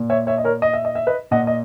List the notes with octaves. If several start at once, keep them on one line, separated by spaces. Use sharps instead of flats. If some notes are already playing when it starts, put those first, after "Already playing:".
Already playing: A#2
C#5 E5
C#5 E5
D#5
A#4 C#5
D#5
E5
D#5
E5
B4 D#5
A#2 D#5 F#5
D#5